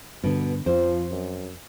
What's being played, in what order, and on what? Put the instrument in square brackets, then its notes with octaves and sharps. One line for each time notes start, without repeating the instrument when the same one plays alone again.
[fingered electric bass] G2 D3 [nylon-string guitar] B2 [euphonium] B3
[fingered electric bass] F2 [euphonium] F3 [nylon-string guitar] C5
[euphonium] F#2